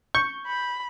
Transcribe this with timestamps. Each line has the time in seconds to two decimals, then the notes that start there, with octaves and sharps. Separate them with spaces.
0.15 C#6 G6
0.47 B5